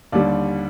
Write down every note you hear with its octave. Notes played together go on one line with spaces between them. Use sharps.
D#2 D3 G3 D5